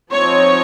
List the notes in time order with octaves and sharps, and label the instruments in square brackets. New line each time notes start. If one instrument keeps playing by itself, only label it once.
[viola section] F3 C4 D#4 C#5